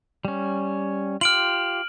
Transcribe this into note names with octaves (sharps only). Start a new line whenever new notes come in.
G3 C#4
F4 G4 F6 D7 F#7